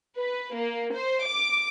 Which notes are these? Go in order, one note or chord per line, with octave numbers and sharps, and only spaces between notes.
B4
A#3
C5
D6